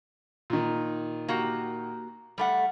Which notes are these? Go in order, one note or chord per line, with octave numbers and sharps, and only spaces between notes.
A#2 D#3
A#3 F#4 G4
G3 A3 F#5